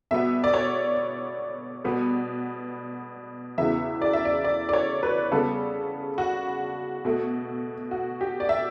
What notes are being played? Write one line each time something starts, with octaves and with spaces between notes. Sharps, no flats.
B2 G3 B3 E5
D5
C#5
B2 G3 B3
E2 C#3 E3 B3 E5
D5
E5
D5
D5
D5
C#5
B4
C#3 G3 B3 A4
F#4
B2 A3
F#4
G4
D5
E5